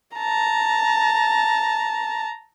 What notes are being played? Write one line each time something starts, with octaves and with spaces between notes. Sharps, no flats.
A5 A#5